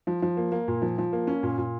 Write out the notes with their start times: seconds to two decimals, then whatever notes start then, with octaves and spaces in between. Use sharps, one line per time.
0.07 F3
0.22 F3
0.37 A#3
0.52 A#3
0.68 A#2
0.82 F3
0.98 F3
1.13 A#3
1.27 C#4
1.43 A#2
1.58 A#2